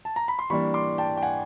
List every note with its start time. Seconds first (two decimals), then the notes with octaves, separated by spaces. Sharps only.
0.05 A5
0.16 A#5
0.28 B5
0.39 C6
0.50 E3 G3 A#3 D4 B5 C#6
0.74 C6 D6
0.98 G5 A5
1.17 G5
1.22 F#5 G#5